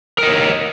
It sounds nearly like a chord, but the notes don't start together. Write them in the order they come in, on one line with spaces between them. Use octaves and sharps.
A#4 D#5 C#5